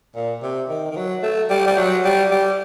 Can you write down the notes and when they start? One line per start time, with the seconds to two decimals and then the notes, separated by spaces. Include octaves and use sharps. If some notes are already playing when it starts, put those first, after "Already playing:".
0.15 A#2
0.42 C3
0.69 D#3
0.91 D#3
0.96 F#3
1.23 A3
1.50 G3
1.67 G3
1.77 F#3
2.04 G3
2.31 G3